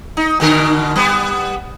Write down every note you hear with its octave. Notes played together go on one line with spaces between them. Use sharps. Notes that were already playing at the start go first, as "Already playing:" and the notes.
D#4
B2 D3 A#4
G3 B3